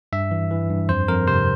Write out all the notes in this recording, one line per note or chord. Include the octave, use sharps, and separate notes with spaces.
G2 E5
E3
E3
G2
F2 C5
F2 A#4
C3 C5